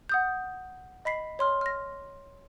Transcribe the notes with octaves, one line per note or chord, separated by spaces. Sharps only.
F#5 D#6 G6
D#5 B5 B6 C7
C#5 C6 F6
F6 A#6